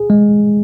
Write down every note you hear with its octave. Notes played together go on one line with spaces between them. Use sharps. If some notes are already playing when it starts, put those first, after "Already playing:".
Already playing: G#4
G#3